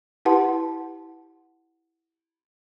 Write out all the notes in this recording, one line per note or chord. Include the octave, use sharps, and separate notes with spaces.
E4 G4 B4 F#5 A5 C6